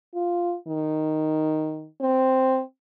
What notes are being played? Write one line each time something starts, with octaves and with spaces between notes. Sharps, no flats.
F4
D#3
C4